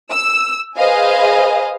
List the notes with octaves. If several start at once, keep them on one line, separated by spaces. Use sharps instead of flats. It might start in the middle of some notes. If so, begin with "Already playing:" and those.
E6
G#4 B4 C5 D#5 F5 G#5